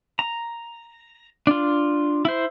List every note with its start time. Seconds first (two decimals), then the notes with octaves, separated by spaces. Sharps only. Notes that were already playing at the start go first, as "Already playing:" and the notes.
0.19 A#5
1.47 D4 F4
2.25 E4 C5